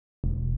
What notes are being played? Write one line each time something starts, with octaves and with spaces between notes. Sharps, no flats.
E1